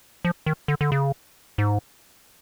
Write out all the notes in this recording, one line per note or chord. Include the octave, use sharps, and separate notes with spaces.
F3
D#3
D3
D3
C#3
G#2